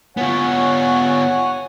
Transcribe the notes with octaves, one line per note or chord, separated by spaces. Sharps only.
B3 F4 C#5 F#5 G#5